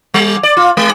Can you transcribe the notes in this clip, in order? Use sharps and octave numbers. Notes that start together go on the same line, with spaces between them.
G3
D5
F4
G#3